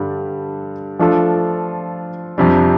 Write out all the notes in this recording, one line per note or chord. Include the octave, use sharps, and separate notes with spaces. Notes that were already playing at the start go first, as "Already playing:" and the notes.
Already playing: G2 D3 G3 D4
F3 A3 D4 F4 A4
F2 C3 G3 D4